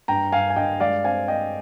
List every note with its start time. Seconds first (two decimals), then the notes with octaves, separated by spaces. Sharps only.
0.08 G2 G5 A#5
0.32 G2 F5 G#5
0.50 G#5
0.56 G2 D#5 G5
0.80 G#3 D5 F5
1.04 C4 F5 G#5
1.28 C4 D#5 G5